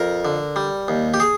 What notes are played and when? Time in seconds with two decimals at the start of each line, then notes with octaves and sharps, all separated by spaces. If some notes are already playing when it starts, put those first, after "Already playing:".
Already playing: F2 A#4
0.25 D3
0.56 G3
0.88 D#2
1.14 G4
1.20 G#4